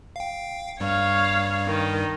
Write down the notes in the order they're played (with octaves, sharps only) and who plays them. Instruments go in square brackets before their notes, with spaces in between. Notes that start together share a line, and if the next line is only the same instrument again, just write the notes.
[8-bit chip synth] F5 G5
[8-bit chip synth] G2 G3 [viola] C#5 F5
[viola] D#3